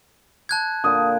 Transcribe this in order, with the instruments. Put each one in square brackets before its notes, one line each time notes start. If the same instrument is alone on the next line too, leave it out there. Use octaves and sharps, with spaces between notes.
[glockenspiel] A5 F#6 G#6
[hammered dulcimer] A#2 D3 G5 [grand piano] D#6